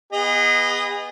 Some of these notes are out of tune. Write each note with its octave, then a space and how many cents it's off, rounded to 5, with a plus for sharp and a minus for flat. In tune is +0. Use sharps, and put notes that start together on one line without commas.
B3 +0 G#4 -30 D#5 +0